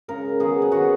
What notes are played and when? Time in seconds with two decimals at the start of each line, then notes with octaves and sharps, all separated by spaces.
0.08 C#3 G#3 C#4 A#4
0.40 D#3 F#3 B3 G#4
0.62 G#4
0.72 D#3 F#3 B3 F#4